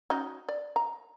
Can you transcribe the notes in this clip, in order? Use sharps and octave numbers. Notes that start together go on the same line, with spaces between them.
C#4 D#4 F#4
D5
A#5